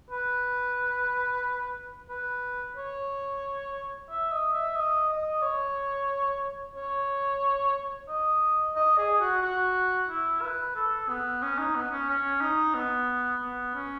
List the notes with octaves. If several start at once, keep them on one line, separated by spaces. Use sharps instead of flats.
B4
B4
C#5
E5
D#5
E5
D#5
D#5
C#5
C#5
D#5
D#5
G#4
F#4
F#4
E4
B4
A4
B3
C#4
D#4
B3
C#4
C#4
D#4
B3
B3
C#4